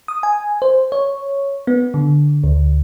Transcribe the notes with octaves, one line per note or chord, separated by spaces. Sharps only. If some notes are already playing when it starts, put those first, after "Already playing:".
D#6
G#5
C5
C#5
B3
D3
D2